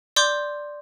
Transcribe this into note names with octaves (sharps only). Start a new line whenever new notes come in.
D5 C6 D6 G6